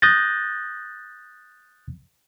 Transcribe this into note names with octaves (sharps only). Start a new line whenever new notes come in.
D#6 F#6 G6 A6 A#6